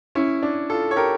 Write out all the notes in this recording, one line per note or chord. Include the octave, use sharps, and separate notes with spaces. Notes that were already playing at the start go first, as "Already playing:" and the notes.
C#4 E4
D4
F4 A4
C#5
G4 A#4